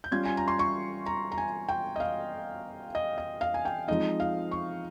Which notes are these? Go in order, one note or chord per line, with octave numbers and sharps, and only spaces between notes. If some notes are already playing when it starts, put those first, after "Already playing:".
G6
G3 C#4 F4 G#6
G#5
A#5
C6
C#6
A#5
A#5
G#5
G5
D#5
F5
D#5
D#5
F5
G#5
G5
F3 G#3 C4 D#4 D#5
F5
C#6